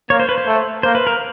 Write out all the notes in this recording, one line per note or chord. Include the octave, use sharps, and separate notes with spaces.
A#3 C#5
C5
B4
C5
A3
A#3 C5
B4
A#4